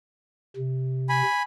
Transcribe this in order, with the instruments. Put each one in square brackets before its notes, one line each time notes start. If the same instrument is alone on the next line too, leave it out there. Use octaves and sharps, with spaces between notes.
[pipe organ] C3
[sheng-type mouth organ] G#5 B5